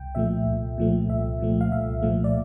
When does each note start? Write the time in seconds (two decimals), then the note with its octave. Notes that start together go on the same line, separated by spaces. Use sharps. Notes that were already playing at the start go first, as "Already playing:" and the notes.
Already playing: C2 G5
0.15 A#2 F3 A3 E5
0.46 C2
0.78 A#2 F3 A3
1.09 C2 E5
1.40 A#2 F3 A3
1.61 F5
1.72 C2 E5
2.02 A#2 F3 A3
2.24 D5